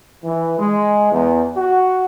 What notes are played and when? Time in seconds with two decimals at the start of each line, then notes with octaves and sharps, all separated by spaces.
0.23 E3
0.59 G#3
1.12 E2
1.56 F#4